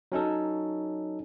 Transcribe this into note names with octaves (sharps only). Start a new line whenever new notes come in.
F#3 C#4 D#4 A4